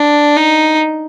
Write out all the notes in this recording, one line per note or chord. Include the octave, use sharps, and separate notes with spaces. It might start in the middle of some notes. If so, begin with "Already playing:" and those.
Already playing: D4
D#4